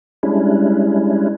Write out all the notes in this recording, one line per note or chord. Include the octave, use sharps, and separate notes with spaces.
G3 G#3 C#4 D4 E4